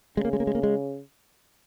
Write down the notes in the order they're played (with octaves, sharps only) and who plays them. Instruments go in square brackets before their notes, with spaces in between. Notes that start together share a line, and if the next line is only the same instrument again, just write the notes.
[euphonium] C#3 [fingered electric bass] G#3
[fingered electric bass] A#3
G#3
A#3
G#3
A#3
G#3